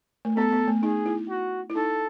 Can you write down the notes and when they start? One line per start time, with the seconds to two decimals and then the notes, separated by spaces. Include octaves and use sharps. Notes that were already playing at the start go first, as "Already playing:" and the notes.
0.25 A3
0.36 B3 A4
0.53 B3
0.68 A3
0.83 D#4 G#4
1.06 E4
1.29 F#4
1.70 E4
1.76 D#4 A4